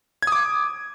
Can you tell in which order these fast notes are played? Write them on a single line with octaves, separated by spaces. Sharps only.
G#6 D#6 D6